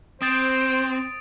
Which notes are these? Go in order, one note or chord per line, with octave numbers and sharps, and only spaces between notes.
C4 C5 D#6 A6 D7